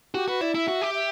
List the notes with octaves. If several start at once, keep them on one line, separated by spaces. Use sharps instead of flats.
F#4 G4
F#4 B4
E4 D5
E4 E5
F#4
G4
E5